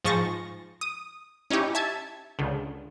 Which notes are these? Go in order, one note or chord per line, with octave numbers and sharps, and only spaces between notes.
G#2 F3 G#4 C#6 A6 A#6
D#6
C#4 D#4 E4 G4 C#5
E5 A5 G#6
C#2 D3